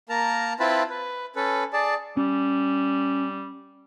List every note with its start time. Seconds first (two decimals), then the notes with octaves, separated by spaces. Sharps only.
0.09 A#3 A#4 A5 A#5
0.60 C4 E4 F4 B4 A5 B5
0.89 B4
1.36 C#4 A4 B4
1.73 G#4 D5 A5
2.17 G3 C#4